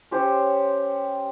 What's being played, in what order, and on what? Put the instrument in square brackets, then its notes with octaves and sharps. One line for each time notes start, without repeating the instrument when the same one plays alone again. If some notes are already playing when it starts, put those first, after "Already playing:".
[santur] C#4 G4 C5 C#5